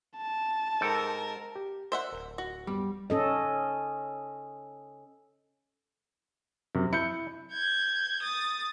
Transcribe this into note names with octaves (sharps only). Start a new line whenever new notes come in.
A5
G#2 A4 A#4 G5
G4
A#4 C5 D5 E5 F#5
D1 A#4
F#4
G2 G3 B3 D6
C#4 A4 D#5
F#2 C3
E4 G6 C#7
G6 G#6
D#6 A6